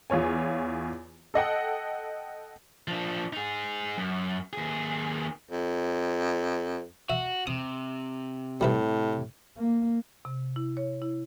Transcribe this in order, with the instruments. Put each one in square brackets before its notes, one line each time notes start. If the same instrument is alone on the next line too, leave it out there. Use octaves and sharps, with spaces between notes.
[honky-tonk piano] E2 F4 C#5 G#5
A4 D#5 F#5 G5
[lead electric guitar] F3 D4
D#4 G#4
F#2
D#2 G#4
[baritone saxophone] F2
[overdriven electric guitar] F#4 [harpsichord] E5
[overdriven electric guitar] C3 [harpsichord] D#6
[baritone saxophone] A2 [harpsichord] G3 E4 B4
[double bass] A#3
[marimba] C3
E4
C#5
E4